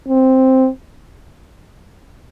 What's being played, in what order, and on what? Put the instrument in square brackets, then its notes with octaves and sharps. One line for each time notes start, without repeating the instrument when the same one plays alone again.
[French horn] C4